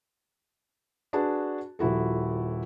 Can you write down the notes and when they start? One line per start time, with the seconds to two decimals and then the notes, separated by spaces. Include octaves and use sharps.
1.13 D4 F#4 G#4 B4 A5
1.79 D#1 F3 E4 F#4 A4